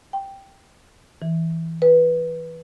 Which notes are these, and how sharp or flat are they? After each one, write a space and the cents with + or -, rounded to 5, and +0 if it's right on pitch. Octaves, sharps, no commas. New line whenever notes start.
G5 +0
E3 -5
B4 -10